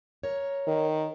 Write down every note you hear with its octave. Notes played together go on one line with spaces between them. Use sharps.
A#4 C#5
D#3